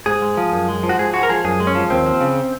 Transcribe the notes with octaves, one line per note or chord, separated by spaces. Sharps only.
G#2 G#4
G#3
F3
F#2
G#3
F3
F#4
G#2 G#4
G#3 F#4
A#4
F3 G#4
F#2 G#4
G#3
C#4
F3
D#2 C4
F3
C#3